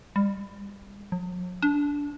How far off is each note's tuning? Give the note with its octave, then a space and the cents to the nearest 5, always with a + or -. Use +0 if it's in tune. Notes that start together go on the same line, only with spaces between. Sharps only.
G3 +30
F#3 -45
D4 -20